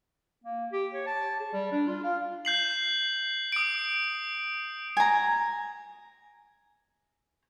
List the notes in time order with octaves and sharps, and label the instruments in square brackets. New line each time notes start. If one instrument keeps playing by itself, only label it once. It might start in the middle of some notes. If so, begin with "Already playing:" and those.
[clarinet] A#3
G4
C#5
A5
G#4
G3
D4
F4
F5
[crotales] G6 C7 F#7
D#6 D7
[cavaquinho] G#5 A#5